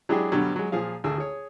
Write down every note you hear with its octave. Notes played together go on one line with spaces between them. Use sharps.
F#3 G#3 D4 E4 G4 G#4
G2 B2 D3 F#3 G3
F#3 G#3
A#2 F3 G#4 F5
G#1 D2 G#4 E6
G#4 C#5